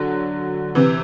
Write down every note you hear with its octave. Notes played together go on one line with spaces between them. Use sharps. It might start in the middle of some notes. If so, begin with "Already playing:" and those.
Already playing: D3 F#3
C3 E3